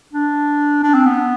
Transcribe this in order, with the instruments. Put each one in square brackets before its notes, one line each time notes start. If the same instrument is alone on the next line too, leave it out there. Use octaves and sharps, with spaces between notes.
[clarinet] D4
D4
C4
B3